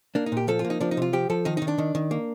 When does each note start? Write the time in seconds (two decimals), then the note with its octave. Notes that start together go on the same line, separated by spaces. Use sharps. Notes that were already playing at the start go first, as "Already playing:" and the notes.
0.15 A#3 D4
0.26 D#4
0.32 A#2 G4
0.48 F3 A4
0.59 F4
0.65 A#3
0.70 D#4
0.81 F3 D4
0.91 D#4
0.97 C3 F4
1.13 F3 G4
1.30 F3 A4
1.45 D#3 D#4
1.57 D#3 D#4
1.68 D4
1.78 D#3
1.95 D#3
2.11 A#3